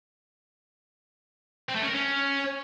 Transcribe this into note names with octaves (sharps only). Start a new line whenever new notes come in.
C4
A3
C#4
A#4
C#4